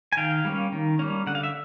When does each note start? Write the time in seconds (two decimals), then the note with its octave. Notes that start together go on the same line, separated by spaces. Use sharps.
0.13 G#5
0.17 D#3 F5 G5
0.45 G3 A#3 C#4
0.72 D#3
0.99 G3 A#3 C#4
1.27 D3 F#5
1.35 F5
1.43 E5